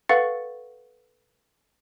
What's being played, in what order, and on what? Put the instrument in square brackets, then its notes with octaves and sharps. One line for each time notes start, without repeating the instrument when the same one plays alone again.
[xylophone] A4 B4 F5 F#5 C#6 A6